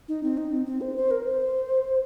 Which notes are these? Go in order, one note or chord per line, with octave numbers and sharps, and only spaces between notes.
D#4
C4
D#4
C4
C4
C5
C5
A#4
C5